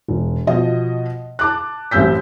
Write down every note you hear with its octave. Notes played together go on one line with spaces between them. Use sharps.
E1
B2 F3 D#5
A5 D6 F#6
A1 F#2 C4 E6 G6 B6